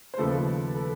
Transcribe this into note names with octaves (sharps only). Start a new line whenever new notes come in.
C5
D#2 C#3 F3 A3 A4 B4
A4 B4